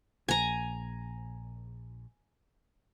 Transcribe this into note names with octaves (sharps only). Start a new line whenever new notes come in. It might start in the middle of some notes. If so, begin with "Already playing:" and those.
A#1 G#5 A#5